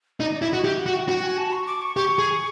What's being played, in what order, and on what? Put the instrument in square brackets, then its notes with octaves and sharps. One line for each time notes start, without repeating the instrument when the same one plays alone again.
[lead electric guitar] D#4 [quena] D5
[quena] D5
[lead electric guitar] E4
[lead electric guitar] F#4 [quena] D#5
[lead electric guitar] G4 [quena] E5
[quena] F#5
[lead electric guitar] F#4
[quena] G5
[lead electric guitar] F#4 [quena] G5
[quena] G#5
A5
C#6
D6
C#6
[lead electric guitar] G4 [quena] C#6
[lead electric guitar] G#4